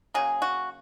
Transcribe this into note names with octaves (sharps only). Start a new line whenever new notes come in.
C#3 F#3 A#3 G#4
F#4